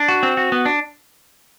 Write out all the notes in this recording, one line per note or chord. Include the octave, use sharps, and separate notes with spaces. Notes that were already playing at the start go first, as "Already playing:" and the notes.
Already playing: D4
F#4
C4
F#4
B3
D4